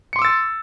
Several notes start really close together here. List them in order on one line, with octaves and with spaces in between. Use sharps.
C#7 C6 D6 E6 A6